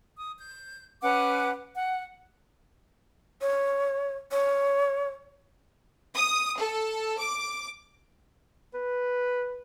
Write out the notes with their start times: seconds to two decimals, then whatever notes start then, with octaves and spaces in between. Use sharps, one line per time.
0.17 D#6
0.38 G6
1.02 C#4 B4 F#5 D6
1.75 F#5
3.41 C#5
4.31 C#5
6.15 D#6
6.58 A4
7.18 D6
8.74 B4